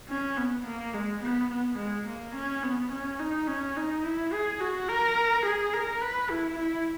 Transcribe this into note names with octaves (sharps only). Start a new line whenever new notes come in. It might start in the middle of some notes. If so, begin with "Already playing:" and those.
C#4
B3
A#3
G#3
B3
B3
G#3
A#3
C#4
B3
C#4
D#4
C#4
D#4
E4
G#4
F#4
A#4
G#4
A#4
B4
E4
E4